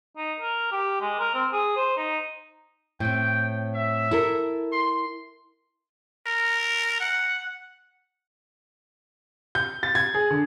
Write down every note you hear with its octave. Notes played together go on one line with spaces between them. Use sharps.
D#4
A#4
G4
G#3
A#4
C4
G#4
C5
D#4
A2 C4 G5
E5
E4 A4 A#4
C6
A#4
F#5
G6
A6
G#6
G#4
D3